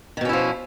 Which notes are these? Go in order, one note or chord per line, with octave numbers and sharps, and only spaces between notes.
B2 D#3 F3 C#4 E4